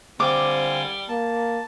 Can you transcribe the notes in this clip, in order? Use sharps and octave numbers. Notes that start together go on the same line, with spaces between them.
D3 G3 C4 F5 G#5 D6
A#3 A5